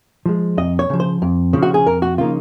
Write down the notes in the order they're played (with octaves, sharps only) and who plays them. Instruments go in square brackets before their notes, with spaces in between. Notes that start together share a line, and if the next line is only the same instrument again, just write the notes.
[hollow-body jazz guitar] F3 G#3
F2 D#5
C#5
C#3 F3
C5
F2
C#3 F3
F#4
G#4
F2 A#4
F#4
C#3 F3 A#3 D#4 F4